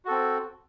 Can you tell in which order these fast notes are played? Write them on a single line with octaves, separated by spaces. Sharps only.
F#4 A4 C4